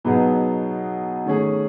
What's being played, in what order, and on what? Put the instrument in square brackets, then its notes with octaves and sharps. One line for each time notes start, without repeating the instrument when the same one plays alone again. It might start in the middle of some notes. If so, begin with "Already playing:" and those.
[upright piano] B2 F#3 B3 D#4 G#4
D#3 A3 C#4 G#4